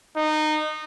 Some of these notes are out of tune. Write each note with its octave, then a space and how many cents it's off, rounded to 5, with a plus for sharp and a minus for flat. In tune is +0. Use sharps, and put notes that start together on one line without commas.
D#4 -20